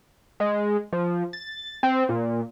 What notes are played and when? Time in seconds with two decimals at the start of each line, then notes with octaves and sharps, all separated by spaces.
0.40 G#3
0.93 F3
1.33 A6
1.83 C4
2.09 A#2